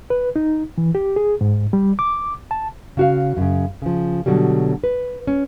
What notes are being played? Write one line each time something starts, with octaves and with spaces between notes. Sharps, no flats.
B4
D#4
E3
G4
G#4
G#2
G3
D6
A5
C#3 F#4 F5
F#2 C#3
C#3 F3
B2 D3 F#3 G3
B4
C#4